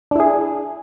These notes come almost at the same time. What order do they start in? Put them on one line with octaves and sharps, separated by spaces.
D4 E4 G#4